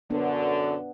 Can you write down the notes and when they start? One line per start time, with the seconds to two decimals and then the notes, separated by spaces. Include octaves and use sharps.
0.10 F#2 D3 B3 D4